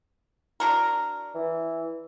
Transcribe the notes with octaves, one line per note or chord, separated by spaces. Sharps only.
D4 F#4 A#4
E3